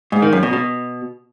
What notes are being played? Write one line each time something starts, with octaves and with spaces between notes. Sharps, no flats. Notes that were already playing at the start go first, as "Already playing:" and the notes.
G#2
D#3
F#2
B2
B2